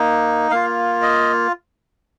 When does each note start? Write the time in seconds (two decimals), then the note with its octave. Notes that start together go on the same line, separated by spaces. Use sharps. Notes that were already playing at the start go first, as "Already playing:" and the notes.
Already playing: A#3 D#4
0.51 A#3 F4 F5
1.02 D#5